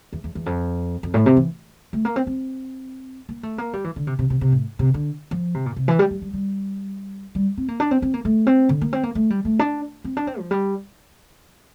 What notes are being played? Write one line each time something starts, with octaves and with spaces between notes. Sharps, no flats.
E2
E2
E2
F2
F2
A2
C3
E3
A3
A#3
C4
C4
A#3
A3
A#3
G3
E3
D3
C3
C3
C3
C3
A2
C3
D3
F3
C3
A#2
C3
E3
G3
G3
G3
G3
G3
C4
A#3
D4
C4
C4
A#3
A3
C4
D3
A#3
C4
A#3
A3
G3
A3
D4
C4
D4
C4
F3
G3